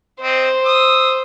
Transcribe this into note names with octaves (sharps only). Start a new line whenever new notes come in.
C4 C5 D#5
D#6 E6